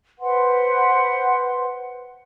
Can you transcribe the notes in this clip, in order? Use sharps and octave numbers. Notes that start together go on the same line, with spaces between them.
B4 C5 F#5 C6